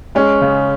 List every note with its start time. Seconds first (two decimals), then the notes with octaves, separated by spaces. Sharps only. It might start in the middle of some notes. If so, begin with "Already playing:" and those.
0.15 G#3 C#4
0.42 C#3